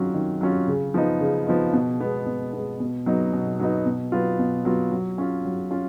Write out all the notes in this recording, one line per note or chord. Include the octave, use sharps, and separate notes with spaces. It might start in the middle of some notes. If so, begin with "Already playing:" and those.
Already playing: D#3 F#3 C#4 F4
D#3
F#3 C#4 F4
C#3
F3 B3 D#4
C#3
F3 B3 D#4
B2
G#3 B3
B2
G#3 B3
B2
F#3 B3 D#4
B2
F#3 B3 D#4
B2
F#3 B3 F4
B2
F#3 B3 F4
F#3
C#4 F4
F#3
C#4 F4